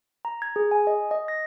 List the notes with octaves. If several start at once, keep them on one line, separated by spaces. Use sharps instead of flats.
A#5
G#6
G#4
G#5
D#5
D#5
A#6